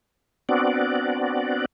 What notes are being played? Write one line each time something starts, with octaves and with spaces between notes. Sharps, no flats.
B3 C4 D4 F#4 D5